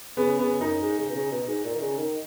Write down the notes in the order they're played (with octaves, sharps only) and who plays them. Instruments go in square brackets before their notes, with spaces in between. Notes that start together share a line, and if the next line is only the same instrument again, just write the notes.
[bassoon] C#3 [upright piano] B3
[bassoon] C#3 [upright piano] B3
[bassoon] F#2 [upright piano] D#4
[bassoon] G#2
C#3
B2
C#3
B2
G#2
A#2
D#3
C#3
D#3